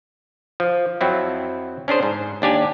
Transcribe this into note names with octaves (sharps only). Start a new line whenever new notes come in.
F3
F2 F#3 C4 E4
C#4 D4 G#4 C5
G#2
D#2 D4 G4 G#5